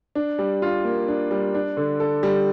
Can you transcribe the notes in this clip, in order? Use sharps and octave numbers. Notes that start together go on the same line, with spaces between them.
D4
G3
F4
A#3
D4
G3
D4
D3
A4
G3